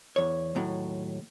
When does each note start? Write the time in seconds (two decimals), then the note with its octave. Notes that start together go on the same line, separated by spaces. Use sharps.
0.16 E2 C#5
0.55 D#2 A2 F#3